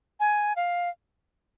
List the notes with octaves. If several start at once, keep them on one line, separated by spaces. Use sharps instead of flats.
G#5
F5